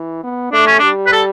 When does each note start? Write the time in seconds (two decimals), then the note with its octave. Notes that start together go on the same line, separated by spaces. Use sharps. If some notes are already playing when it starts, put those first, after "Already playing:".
Already playing: E3
0.24 B3
0.53 A3 D4
0.67 C#4
0.79 G3 D4
1.06 B4
1.12 A4